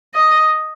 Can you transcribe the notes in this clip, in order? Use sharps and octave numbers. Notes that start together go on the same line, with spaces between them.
D#5